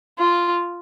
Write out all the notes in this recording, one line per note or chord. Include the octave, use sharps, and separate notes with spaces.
F4